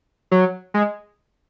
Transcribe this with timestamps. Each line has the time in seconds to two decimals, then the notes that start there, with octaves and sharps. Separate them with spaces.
0.31 F#3
0.74 G#3